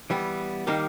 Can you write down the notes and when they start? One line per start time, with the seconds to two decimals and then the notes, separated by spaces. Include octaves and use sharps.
0.10 E3 G3 B3
0.67 D#3 G3 A#3 D#4 G4